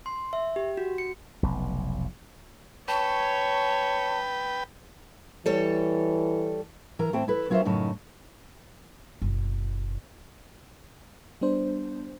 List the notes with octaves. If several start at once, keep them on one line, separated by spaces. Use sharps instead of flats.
C6
E5
G4
F#4
C#7
F1 B1
B4 C#5 G5 A5
E3 G3 A4 C#5
E3 A#4 A#5
A2 A3 C4 E4 G5 A5
E4 A4 B4
F#3 C#4 F4 A#4 C5 E5
F#2 A2 C#3 D#4 C#5 A5
F#1 B2
G3 B3 D4 C5